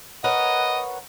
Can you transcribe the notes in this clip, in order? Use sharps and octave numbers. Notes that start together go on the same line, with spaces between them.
A#4 B4 C#5 D#5 F#5